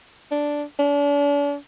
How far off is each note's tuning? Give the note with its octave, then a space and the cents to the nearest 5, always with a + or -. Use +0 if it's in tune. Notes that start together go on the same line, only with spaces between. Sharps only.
D4 -5
D4 -40